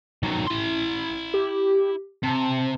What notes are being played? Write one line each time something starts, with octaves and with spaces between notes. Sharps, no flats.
D#3 F#3
E4 C6
G4
C3 A5